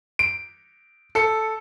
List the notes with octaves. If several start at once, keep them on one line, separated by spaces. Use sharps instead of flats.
D7
A4 C#7